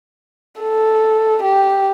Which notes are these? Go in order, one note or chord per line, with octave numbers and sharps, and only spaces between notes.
A4
G4